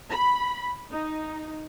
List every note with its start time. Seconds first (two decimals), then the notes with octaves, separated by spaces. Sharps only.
0.11 B5
0.92 D#4